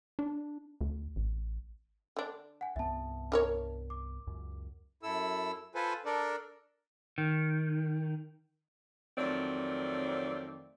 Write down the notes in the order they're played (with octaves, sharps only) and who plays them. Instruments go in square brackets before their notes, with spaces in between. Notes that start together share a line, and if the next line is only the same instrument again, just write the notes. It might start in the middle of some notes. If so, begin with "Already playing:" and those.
[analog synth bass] D4
D2
A1
[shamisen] D3 D4
[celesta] F#5 G#5
[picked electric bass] C2 G2 B3 [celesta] E5 A5
[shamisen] D4 A#4 C#5
[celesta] D6
[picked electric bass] C#2 F#2
[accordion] F#2 E4 A4 E6
F4 A4 B4 C5 G#5
D4 A4 A#4 D5
[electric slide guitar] D#3
[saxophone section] F2 D#3 F#3 A3 C4 D5